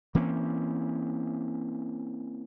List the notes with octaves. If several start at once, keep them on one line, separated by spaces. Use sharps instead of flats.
E3 A#3 C4 C#4